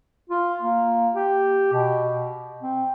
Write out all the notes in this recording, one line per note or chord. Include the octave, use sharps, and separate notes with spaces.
F4
A#3
G4
B2
C4